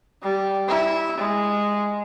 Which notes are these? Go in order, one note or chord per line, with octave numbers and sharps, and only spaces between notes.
G3
E4
G#3